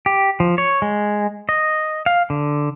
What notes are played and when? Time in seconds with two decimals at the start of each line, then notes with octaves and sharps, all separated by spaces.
0.06 G4
0.40 F3
0.58 C#5
0.82 G#3
1.49 D#5
2.06 F5
2.30 D3